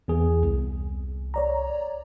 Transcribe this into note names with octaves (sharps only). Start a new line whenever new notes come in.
E2 G#4
C2
C#5 D5 A#5